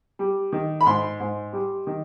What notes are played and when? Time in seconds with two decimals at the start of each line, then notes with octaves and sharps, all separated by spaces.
0.19 G3
0.52 D#3
0.81 B5
0.86 G#2 C6
1.20 G#2
1.53 G3
1.87 D#3